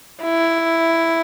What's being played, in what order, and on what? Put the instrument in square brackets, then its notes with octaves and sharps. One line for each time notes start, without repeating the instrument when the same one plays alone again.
[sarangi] E4